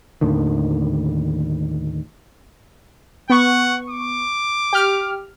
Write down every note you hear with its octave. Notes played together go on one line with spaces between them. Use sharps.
D#2 A2 D3 D#3
B3 F#5 C#6
D6
G4 F6